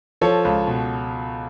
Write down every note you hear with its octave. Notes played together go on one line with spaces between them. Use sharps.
F3 A4 C#5
C#2
B2